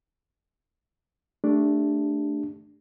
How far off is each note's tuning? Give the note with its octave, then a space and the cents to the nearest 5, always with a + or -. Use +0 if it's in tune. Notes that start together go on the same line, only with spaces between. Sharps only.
A3 +0 D4 +0 G4 +25